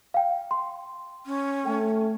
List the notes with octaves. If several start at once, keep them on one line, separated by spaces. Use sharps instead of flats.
F5 G5
C6
C#4
A3 G5